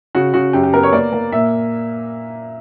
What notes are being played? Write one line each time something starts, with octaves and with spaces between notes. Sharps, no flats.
C#3 F#4
C#3 F#4
F#2 G4
G4
B3 A#4
C#5
A#3 D5
A#3
A#2 E5